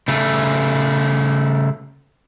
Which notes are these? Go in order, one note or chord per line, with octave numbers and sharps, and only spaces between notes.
C#3 A3